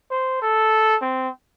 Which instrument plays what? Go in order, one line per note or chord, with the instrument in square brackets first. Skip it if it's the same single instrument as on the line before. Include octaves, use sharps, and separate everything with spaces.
[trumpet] C5
A4
C4